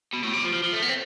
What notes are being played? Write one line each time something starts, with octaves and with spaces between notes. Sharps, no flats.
B2
A2
C3
F3
F3
F3
A3
B3
C4